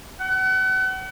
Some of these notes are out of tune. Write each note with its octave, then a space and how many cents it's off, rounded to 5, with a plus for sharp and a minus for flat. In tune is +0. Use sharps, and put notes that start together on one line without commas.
F#5 +35